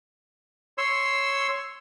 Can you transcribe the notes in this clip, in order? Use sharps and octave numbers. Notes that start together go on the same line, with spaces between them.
C#5 C6 E6